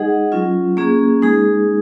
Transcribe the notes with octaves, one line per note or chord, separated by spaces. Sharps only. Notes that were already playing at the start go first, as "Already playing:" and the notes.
Already playing: G#3 D#4 G#4 D#5 F#5
F#3 C#4 F4
A#3 C#4 G#4
G#3 D#4 G#4